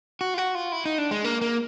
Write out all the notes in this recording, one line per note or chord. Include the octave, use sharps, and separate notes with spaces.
F#4
F4
F#4
F4
E4
D#4
D4
G#3
A#3
A#3